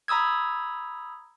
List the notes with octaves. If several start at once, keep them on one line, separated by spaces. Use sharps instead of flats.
A#5 B5 D#6 E6 G#6